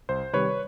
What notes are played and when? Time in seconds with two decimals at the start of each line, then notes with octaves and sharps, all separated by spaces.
0.09 C2 C5
0.33 C3 D#3 G3 B4 C#5